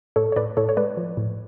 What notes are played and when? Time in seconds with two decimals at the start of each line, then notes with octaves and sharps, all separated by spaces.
0.16 A2 A4 C#5
0.32 C#5
0.36 A2 B4 D5
0.57 A2 A4 C#5
0.69 C#5
0.77 G#3 B4 D5
0.97 F3
1.17 A2